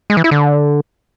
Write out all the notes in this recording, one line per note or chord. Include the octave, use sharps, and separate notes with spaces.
G#3
E3
E4
D3